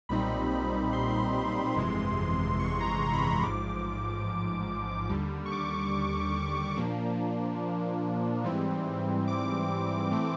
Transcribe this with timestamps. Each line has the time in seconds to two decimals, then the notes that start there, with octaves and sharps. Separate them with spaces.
0.09 B1 A#2 G3 C4 D#4 B5
0.51 B5
0.93 C6
1.76 G1 F2 C3 E3 G#3
2.59 C#6
2.81 A#5
3.01 C6
3.13 B5
3.23 C6
3.43 A1 G#2 F3 D6
5.09 D#2 D3 G3
5.46 C#6
5.52 D6
6.76 A#2 F3 A#3 D4
8.44 G#2 E3 G3 C4
9.28 D6
10.11 A2 E3 A3 C4